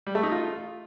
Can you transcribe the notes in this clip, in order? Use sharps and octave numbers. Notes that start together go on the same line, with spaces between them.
G3
A3
D#4
F4